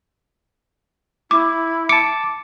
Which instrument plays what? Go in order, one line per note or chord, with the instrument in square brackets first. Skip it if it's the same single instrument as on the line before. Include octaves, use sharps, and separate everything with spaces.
[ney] E4 [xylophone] D6
[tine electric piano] A5 D6 [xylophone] C#7